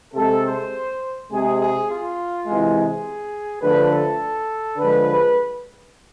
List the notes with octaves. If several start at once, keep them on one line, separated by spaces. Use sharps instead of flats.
C3 G#3 A4
C5
C3 G#3 G#4
G#4
F4
C3 E3 G#3
G#4
D3 F3 A3 B4
A4
D3 F3 G#3 B4